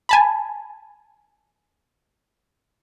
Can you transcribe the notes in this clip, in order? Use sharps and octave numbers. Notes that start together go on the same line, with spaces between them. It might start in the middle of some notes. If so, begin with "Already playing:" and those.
G#5 A5 B5